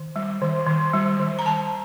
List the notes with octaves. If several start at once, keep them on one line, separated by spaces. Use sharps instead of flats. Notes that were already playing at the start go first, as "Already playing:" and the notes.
Already playing: D#3
G3
D#3
D#3
G3
D#3
A#5
D#3 A5